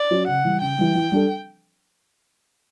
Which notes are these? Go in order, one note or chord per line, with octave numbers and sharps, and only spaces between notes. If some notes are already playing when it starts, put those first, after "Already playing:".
Already playing: D5
F#3 C#4 F#4 C#5
C#3 F#5
E3 G3
C#3 G5
E3 G3
E3
G3 D4 A4